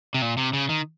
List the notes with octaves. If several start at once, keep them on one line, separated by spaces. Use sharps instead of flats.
C3
A#2
C3
C#3
D#3